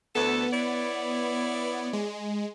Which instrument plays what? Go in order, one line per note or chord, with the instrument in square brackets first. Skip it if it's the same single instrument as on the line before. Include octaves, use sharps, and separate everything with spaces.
[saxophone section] D2 E3 A4 [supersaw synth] B3
[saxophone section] E4 C#5 D5
[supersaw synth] G#3